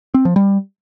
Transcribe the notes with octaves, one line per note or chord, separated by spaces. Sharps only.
C4
F3
G3